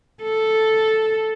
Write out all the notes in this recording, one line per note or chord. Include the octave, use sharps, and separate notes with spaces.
A4